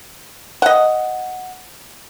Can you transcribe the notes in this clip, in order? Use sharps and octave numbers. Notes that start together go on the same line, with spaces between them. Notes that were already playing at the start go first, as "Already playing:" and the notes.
D#5 F#5